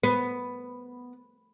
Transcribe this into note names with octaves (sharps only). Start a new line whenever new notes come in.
B3